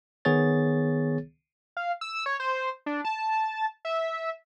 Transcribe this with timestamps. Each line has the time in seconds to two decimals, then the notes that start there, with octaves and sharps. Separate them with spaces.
0.25 D#3 B3 G#4 C#5 A6
1.77 F5
2.01 E6
2.26 C#5
2.40 C5
2.86 D4
3.05 A5
3.85 E5